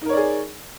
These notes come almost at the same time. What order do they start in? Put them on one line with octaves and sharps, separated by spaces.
D#4 A#4 C#5 D5 G#4